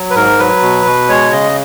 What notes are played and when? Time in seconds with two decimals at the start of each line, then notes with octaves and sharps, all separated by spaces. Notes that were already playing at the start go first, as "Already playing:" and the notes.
Already playing: F#3
0.10 B4
0.16 G#2 A#4
0.39 F#3 B4
0.62 B2
0.86 B2
1.09 G#3 C#5
1.31 C#3 D#5